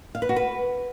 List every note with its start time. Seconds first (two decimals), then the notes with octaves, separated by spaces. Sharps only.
0.15 F5
0.22 B4
0.29 F#4
0.36 B4